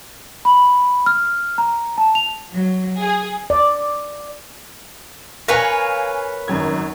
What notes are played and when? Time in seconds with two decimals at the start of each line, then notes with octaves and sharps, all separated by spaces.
0.45 B5
1.06 F6
1.58 A#5
1.98 A5
2.15 F7
2.52 F#3
3.01 G#4
3.50 D5
5.48 A#4 B4 C#5 F5 G#5 F#6
6.48 G#1 F#2 G#6